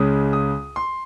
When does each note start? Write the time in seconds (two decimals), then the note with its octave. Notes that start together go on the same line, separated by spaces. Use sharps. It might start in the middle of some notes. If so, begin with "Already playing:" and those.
Already playing: C#2 C#3 G#3 D#6
0.33 D#6
0.76 C6